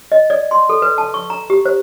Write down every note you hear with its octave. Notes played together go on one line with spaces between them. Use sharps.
D#5
D5
C6
A4
B4
A5
C#6
A#5
G4
C5